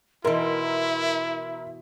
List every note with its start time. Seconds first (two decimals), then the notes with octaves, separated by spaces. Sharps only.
0.24 B2 E3 E4 A#4 E5 C6